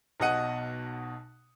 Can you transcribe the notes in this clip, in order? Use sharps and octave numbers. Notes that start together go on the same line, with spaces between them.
B1 B2 D#5 F#5 D#7